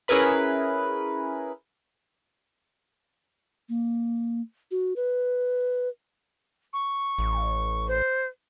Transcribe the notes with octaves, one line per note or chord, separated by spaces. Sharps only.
C#4 E4 G#4 A#4 B4 B5
A#3
F#4
B4
C#6
A1
C5